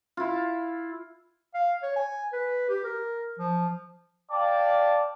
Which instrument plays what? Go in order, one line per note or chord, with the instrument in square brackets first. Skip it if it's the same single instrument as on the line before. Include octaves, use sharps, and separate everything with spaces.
[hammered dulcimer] E4 F4
[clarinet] F5
C#5
G#5
B4
G4
A#4
F3
[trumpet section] D5 F5 G5 A5 D6